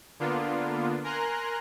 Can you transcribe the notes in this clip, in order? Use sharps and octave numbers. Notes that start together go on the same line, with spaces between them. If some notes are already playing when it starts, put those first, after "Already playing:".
D3 A#3 B3 D4 F4
A#4 G#5 A#5 C6 F#6